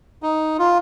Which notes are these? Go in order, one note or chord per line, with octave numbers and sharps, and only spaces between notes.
D#4
F4